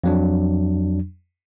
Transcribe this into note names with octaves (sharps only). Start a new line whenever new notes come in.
F2 F#3 D4